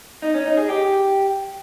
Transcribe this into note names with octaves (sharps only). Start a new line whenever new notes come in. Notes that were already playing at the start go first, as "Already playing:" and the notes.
D#4
C#4
D#4
G#4
G4